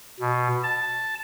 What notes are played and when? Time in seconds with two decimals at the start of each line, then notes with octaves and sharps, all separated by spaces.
0.20 B2
0.64 A5